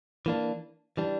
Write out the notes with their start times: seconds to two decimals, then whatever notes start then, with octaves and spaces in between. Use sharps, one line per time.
0.26 E3 A#3 D4
0.97 E3 G3 D4